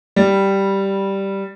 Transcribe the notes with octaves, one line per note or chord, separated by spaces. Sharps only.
G3